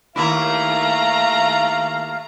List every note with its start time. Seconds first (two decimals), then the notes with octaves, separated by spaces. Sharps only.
0.16 D#2 A3 E4 F5 A#5